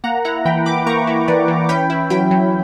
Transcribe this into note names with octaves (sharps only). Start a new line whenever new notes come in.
A#3 F#5 A#5
E4 F#5 A#5
E3 G5 B5
E3 B5 D6
A#3 A#5 C#6
E4
E3 B4 D5
E3
C#4 G5 B5
E4
F#3 G5 B5
F#3